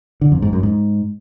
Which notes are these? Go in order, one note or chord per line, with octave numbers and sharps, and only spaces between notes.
D3
F2
G#2
F#2
G#2